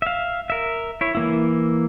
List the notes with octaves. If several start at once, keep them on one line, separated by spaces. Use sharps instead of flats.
E5 F5
A#4 E5
E4 C#5
E3 A#3 E4